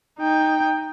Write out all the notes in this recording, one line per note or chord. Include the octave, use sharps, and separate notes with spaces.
D#4 G5